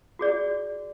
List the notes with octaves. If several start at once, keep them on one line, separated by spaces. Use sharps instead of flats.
F#4 G#4 D5